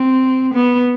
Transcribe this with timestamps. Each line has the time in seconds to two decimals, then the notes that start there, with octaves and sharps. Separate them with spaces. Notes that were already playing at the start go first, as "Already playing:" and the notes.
Already playing: C4
0.54 B3